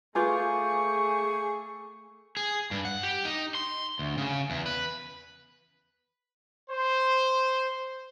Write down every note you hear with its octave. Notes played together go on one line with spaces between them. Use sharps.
A3 F4 G#4 B4 G#5 C#6 D6 G6
G#4
G2
F#5
G4
D#4
C6
D2
C#3
E2
B4
C5